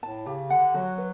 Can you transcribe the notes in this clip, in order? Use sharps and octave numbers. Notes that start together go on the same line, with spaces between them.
A2 A5
C#3 G4
D3 F#5
F#3 F#4
B4